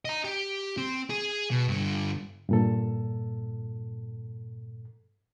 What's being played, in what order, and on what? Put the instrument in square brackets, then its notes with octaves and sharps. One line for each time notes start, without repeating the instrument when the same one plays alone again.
[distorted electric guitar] D#5 A#5
G4
C4
G#4
B2
G2 D3
[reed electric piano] G2 A#2 A4